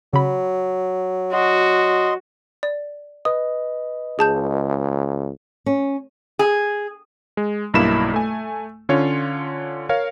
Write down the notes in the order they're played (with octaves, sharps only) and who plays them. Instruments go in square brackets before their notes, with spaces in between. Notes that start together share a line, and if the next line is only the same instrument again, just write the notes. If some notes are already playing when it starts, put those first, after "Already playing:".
[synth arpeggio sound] C#3 B5 [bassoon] F#3
[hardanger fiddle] F#4 [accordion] D#5 C6
[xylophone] D5
[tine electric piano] B4 D#5 [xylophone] D#6
[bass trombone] C#2 [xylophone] G#4 A5 G6
[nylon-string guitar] C#4
[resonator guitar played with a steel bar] G#4
[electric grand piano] G#3
B1 G2 A#3 E4 B5 E7
A3 G#5
D3 C#4 F4 C#5
A#4 C#5 F5